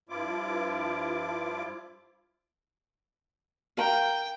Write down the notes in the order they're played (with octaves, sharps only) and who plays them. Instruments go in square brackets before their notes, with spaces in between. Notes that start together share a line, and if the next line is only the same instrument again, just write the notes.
[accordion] G2 F3 E4 F4 D6
[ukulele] A#4 F5 A#5 [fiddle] G5